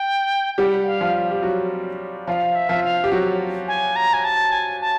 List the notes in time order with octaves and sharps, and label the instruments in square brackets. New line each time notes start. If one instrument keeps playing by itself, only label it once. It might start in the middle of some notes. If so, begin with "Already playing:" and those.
Already playing: [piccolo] G5
[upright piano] G3 G4 [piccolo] F#5
[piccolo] F5
[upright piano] F3 F4
G4
F#3 F#4
[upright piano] F3 F4 [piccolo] F5
[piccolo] E5
[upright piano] F3 F4
[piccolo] F5
[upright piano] G4
F#3 F#4
[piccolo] G#5
A#5
G#5
A5
G#5
A5